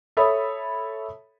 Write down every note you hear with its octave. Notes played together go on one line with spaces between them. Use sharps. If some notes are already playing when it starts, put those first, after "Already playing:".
A4 C#5 E5 B5 D#6